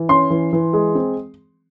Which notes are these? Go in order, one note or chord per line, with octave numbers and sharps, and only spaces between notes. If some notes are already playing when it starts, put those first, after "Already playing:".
Already playing: E3
C#4 C6
E3
E3
G#3
C4